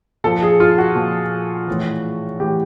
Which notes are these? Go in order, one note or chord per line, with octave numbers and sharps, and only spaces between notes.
A#2 F3 A4
G#4
F4
F#4
A#2 F3
A2 E3
A2 E3 G4